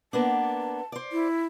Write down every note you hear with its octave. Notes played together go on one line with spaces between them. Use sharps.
A#3 B3 D4 A5
C5 D5
E4